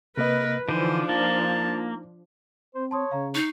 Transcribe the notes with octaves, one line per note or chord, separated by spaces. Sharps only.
C3 A#3 A#4 B4 D#5
D3 E3 F3 D4 D#4 C5
A#3 A5
C4 C5
C#5 A5 C6 D#6
C#3 F5 A#5
D#4 C#6 C7